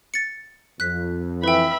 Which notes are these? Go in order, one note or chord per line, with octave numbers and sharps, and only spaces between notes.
A6 C#7
F2 F#6 B6
E3 B4 E5 G5 B5